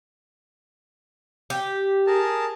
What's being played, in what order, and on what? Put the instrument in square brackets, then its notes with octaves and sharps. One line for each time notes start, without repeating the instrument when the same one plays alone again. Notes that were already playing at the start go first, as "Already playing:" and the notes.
[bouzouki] G4
[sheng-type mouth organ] G#4 A#4 A5